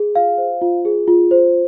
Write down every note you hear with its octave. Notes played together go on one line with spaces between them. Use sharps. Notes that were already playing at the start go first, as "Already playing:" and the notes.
Already playing: G#4
F4 F5
C5
F4
G#4
F4
C5